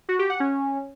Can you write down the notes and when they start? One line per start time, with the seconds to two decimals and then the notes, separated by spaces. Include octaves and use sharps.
0.09 F#4
0.19 G4
0.30 F#5
0.40 C#4